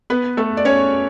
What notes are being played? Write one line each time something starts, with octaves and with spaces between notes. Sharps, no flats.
B3 B4
A3 A4
D5
C#4 C#5